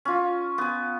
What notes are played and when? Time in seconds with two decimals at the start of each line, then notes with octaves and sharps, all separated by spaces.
0.05 C#4 F4
0.58 B3 G#5